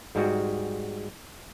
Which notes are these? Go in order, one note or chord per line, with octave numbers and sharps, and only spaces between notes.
G#2 G3 G#3 F#4